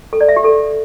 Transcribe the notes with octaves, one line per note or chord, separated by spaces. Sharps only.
A4
D5
E5
G4
A4